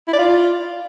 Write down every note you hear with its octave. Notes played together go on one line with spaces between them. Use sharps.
E4
D5
F4